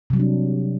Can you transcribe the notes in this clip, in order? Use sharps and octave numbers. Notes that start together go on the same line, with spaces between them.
C3 F#3 G3 D4